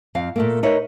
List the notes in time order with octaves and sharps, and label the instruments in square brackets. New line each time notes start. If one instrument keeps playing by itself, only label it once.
[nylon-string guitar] F2 F5
A#2 A3 A#3
D#4 A#4 B4 C#5 D#5 E5